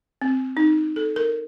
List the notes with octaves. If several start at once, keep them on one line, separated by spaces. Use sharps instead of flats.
C4
D#4
A4
A#4